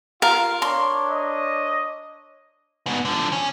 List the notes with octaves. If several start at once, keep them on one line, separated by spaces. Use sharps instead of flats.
F4 A#4 F5
D4 C#5 C6
D#5
G#2 B3
D3 F3
C#4